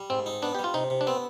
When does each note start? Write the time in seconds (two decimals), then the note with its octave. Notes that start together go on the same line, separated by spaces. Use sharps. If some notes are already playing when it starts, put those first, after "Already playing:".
Already playing: G3
0.10 G#2 C4
0.26 D#4
0.42 B3 D4
0.55 G3 G4
0.64 F4
0.74 C3 D#4
0.90 C3
1.01 D4
1.07 B3 C4